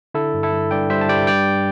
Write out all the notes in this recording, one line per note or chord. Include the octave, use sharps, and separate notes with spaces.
D3 E4 A4
G2
E4 A4
G2
G2 D5 G5
G3 C5 E5
A5
G3 D5 G5
G2 D5 G5